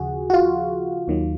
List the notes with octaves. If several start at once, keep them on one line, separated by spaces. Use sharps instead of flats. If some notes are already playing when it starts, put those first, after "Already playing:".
Already playing: D#2 C#3 F3 F#4 G#4
F#4
F4
D#2 D#3 F#3